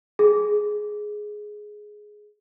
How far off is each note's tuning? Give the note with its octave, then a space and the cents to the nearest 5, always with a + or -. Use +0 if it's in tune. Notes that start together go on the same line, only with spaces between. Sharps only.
G#4 +10